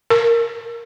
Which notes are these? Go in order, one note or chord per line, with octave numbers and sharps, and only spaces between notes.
A#4